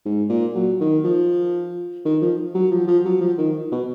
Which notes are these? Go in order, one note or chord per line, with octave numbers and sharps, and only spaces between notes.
G#2
A#2
F#3
D#3
F3
D#3
F3
F#3
F3
F3
F#3
F3
D#3
B2